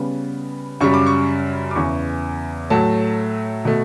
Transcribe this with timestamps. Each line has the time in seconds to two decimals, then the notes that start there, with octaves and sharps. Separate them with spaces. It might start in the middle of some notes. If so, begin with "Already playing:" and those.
Already playing: C#3 G3 B3
0.80 F#2 C#3 G3 C#6
0.94 D6
1.07 C#6
1.71 D6
1.75 E2 C#3 E3 C#6
2.70 A2 F#3 A3 A5
3.65 B2 A3